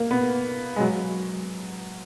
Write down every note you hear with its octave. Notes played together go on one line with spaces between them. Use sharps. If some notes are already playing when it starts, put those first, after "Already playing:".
Already playing: A#3
B3
G#3
F#3